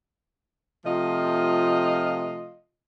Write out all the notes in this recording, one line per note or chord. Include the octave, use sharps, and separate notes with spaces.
C3 F3 A3 F4 D#5